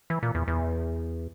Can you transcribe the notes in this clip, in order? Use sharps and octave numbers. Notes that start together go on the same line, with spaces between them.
E3
A#2
E2
E2